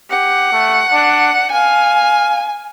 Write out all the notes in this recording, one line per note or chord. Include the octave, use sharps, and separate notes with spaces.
G4 F#5
A3
D4
F5 G#5